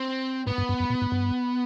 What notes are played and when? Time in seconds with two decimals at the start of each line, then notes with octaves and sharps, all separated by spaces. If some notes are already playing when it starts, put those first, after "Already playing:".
Already playing: C4
0.47 G#2 B3
0.58 G2
0.69 G2
0.80 F#2
0.90 A#2
1.02 G#2
1.12 G2